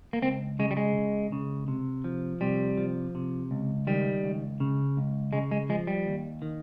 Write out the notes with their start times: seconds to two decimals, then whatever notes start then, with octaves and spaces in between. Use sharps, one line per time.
0.13 A#3
0.22 C#2 C4
0.59 C#3 G#3
0.71 G3
0.77 G#3
0.96 C#2
1.32 C#3
1.68 C3
2.04 F3
2.41 C3 G3
2.78 F3
3.15 C3
3.51 C#2
3.87 D#3 G3
4.24 C#2
4.60 C#3
4.97 C#2
5.33 C#3 G#3
5.51 G#3
5.69 F3 G#3
5.87 G3
6.06 D#2
6.42 D#3